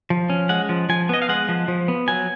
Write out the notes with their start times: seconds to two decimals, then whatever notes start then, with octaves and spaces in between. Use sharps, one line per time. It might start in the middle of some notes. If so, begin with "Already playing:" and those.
0.10 F3
0.30 C#4
0.49 G#3 F#5
0.69 F3
0.89 F3 G#5
1.09 B3 D#5
1.22 F5
1.29 G#3 F#5
1.49 F3
1.68 F3
1.88 B3
2.08 F#3 G#5